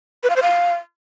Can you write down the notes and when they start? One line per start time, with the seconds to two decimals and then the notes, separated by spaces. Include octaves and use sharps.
0.23 B4
0.29 F5
0.36 C5
0.42 F5